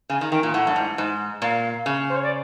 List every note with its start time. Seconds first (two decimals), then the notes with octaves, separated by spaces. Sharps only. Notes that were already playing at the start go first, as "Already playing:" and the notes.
0.09 C#3 G#5
0.21 D#3
0.31 D#3 G5
0.43 A#2
0.54 A2 F#5
0.67 G2
0.76 G#2
0.98 G#2
1.42 A#2 F5
1.86 C#3
2.09 C5
2.16 C#5
2.22 D5